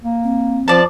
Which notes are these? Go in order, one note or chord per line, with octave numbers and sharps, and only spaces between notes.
A#3
C4
F3 D5 A5